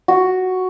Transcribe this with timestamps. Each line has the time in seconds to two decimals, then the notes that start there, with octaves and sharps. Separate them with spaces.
0.08 F#4